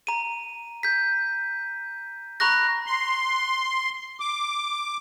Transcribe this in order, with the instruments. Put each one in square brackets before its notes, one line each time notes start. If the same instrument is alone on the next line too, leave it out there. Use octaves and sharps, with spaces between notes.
[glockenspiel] A#5 D#7
G6 B6
A#5 B5 C#6 F#6 A#6
[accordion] C6
D6